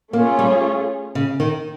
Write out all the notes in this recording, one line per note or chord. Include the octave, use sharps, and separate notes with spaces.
A3 A#3 C#4 F4 G#4 C#5
G3
C#3
D#3